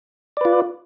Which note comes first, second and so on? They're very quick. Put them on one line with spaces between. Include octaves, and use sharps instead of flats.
D5 B4 F4